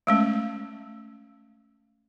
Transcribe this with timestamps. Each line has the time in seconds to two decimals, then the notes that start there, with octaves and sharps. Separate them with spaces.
0.07 G#3 A3 C#4